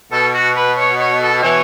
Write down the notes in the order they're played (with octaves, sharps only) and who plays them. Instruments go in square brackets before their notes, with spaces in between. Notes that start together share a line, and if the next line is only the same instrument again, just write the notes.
[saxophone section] B2 [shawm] A4
[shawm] F#4
B4
C#5
C#5
A4
[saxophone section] B2 E3 [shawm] C#5